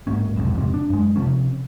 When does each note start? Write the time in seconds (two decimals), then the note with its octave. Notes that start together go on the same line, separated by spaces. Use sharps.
0.07 D1 G#2 A#3 C#4
0.36 F1 B1 F2 G#2
0.54 D1 F2 G#2 C3
0.74 D4
0.90 F#2 G#3
1.16 C3 D#3 F3 C#4